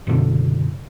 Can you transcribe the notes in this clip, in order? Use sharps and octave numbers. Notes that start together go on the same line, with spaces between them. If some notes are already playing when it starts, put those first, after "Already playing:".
F#1 B2 D3